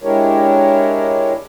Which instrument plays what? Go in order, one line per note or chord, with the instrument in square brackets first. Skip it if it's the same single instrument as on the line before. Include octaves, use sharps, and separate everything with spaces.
[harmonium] G#3 D4 E4 G4 A#4 C#5